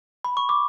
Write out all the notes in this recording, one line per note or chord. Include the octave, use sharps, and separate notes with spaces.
B5
C#6
D6